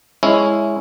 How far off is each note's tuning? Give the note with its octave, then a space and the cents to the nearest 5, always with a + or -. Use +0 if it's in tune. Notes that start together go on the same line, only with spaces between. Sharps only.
G#3 +0 C#4 +5 E4 +0